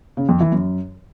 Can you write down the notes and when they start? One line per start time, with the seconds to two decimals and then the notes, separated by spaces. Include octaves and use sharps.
0.17 C#3
0.29 F2
0.40 E3
0.52 F#2